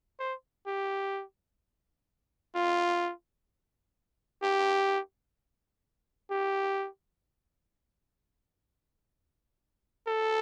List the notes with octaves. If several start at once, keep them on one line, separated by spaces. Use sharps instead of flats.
C5
G4
F4
G4
G4
A4